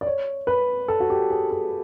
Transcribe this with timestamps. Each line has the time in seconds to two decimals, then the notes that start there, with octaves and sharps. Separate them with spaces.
0.01 D5
0.07 C#5
0.47 B4
0.88 A4
1.00 F#4
1.10 G4
1.30 G#4
1.51 A4